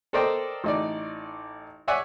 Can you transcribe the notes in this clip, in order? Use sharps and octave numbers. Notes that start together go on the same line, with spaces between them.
A4 A#4 C5 D5 D#5 G5
A1 D#4 D5
C#5 D5 E5 F#5 G#5